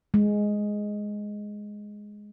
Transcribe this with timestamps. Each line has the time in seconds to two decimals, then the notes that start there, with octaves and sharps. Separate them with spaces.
0.14 G#3